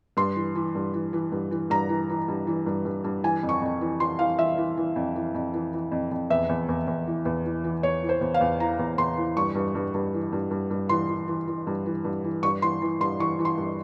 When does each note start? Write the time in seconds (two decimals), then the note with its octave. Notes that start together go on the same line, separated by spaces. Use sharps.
0.17 G2 C6
0.36 E3
0.55 E3
0.75 G2
0.94 E3
1.13 E3
1.32 G2
1.51 E3
1.70 G2 A#5
1.89 E3
2.09 E3
2.28 G2
2.47 E3
2.66 G2
2.85 G2
3.04 G2
3.24 E3 G#5
3.43 F2
3.49 C#6
3.62 F2
3.81 E3
4.00 E3 C6
4.19 E3 F5
4.39 E3 E5
4.58 E3
4.77 E3
4.96 F2
5.15 E3
5.35 F2
5.54 E3
5.73 E3
5.92 F2
6.11 F2
6.30 E2 E5
6.49 E2
6.69 E2
6.88 E2
7.07 E3
7.25 E2
7.45 E3
7.64 E3
7.83 E2 C#5
8.03 E3
8.09 C5
8.21 E2
8.34 F5
8.41 E2
8.60 E3 A#5
8.79 E2
8.98 E2 C6
9.17 E3
9.37 G2 C#6
9.55 G2
9.75 G2
9.94 G2
10.14 E3
10.33 G2
10.51 G2
10.71 G2
10.89 E3 C6
11.09 E3
11.28 E3
11.48 E3
11.67 G2
11.86 E3
12.05 G2
12.24 E3
12.43 G2 C#6
12.62 E3 C6
12.82 E3
13.01 G2 C6
13.19 E3 C#6
13.39 E3
13.45 C6
13.58 G2